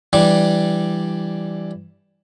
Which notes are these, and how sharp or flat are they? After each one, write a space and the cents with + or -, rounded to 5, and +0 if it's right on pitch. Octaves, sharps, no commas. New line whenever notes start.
E3 +20 G3 +0 D4 +0